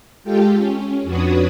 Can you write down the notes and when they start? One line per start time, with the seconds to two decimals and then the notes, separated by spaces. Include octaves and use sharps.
0.24 G#3 F4 G4 A4 G5
0.55 C#4
1.03 F2 D4 F#4 B4 C#5 D#6